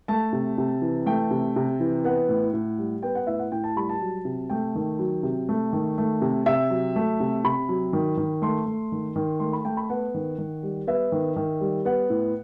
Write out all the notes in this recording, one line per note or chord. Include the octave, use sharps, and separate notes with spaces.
A3 A5
C3
C3
E3
A3 G5
C3
C3
E3
B3 F#5
A2
A2
G3
B3 G5
F#5
A2 E5
F#5
A2 G5
A5
G3 B5
A5
F#3
C3
A3 G5
D#3
F#3
C3
A3
D#3
A3
C3
C3 E5
F#3
A3
C3
C3 B5
F#3
D#3
D#3
A3 C6
A3
D#3
D#3
A3 C6
B5
A3 G5
B5
B3 F#5
D#3
D#3
G3
B3 E5
D#3
D#3
G3
B3 F#5
A2